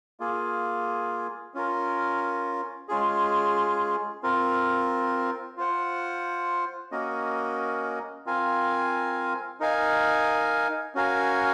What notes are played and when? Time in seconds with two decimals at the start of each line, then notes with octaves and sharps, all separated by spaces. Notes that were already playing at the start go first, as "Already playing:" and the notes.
0.20 A#3 F4 G#4
1.54 C#4 F4 A#4
2.89 G#3 C#4 F4 G#4
4.23 C4 F4 A#4
5.57 F4 C5 F#5
6.92 A#3 C#4 F#4 A#4 D#5
8.26 C4 F4 A#4 F5 G#5
9.60 D#4 A#4 F5 G#5
10.95 C#4 F#4 A#4 F5 G#5